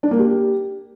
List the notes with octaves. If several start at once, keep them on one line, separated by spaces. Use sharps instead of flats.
D4
A#3
G4